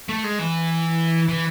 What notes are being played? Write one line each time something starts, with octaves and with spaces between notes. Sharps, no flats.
A3
G#3
E3
E3